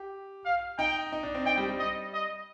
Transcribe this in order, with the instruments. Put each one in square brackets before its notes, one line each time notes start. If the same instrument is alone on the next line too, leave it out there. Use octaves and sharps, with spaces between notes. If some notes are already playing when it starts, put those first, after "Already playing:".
Already playing: [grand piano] G4
[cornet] F5
[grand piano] D#4 [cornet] G5
[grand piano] D#4
D4
C4
[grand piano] D#4 [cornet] G5
[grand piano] G3
G3
[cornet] D#5
D#5